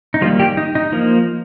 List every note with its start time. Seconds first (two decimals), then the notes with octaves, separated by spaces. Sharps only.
0.14 D#4
0.21 D#3 F3 G3 A#3 F4
0.39 G3 G4
0.57 D#4
0.75 D#4
0.92 F3 A#3